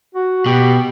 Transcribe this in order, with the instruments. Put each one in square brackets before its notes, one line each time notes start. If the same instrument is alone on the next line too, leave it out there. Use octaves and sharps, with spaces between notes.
[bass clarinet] F#4
[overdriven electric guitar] B2 [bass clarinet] G4